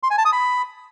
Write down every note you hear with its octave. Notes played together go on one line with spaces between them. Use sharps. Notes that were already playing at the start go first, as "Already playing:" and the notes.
C6
G#5
A5
D#6
B5